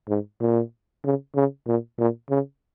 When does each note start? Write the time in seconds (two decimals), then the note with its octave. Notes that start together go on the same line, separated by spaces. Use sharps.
0.08 G#2
0.41 A#2
1.04 C#3
1.35 C#3
1.67 A#2
1.99 A#2
2.30 C#3